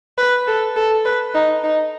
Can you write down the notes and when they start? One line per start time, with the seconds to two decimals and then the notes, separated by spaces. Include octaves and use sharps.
0.18 B4
0.47 A4
0.76 A4
1.05 B4
1.35 D#4
1.64 D#4